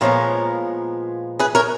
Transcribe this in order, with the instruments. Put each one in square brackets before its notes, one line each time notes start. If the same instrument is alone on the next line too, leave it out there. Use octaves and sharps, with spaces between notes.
[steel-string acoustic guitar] A#2 F3 G#3 B3 A#4 C#5
G#4 B4
A#4 C#5